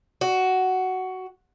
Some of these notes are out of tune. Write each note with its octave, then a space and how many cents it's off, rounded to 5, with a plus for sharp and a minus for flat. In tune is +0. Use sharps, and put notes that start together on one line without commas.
F#4 +10